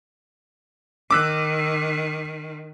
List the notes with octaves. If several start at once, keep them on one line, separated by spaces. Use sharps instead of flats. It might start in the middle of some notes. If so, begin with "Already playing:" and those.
D#3 D6 E6 F#6